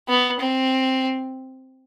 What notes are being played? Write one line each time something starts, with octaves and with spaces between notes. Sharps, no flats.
B3
C4